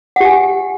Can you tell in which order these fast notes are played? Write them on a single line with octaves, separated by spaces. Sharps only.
F#5 G4 G#5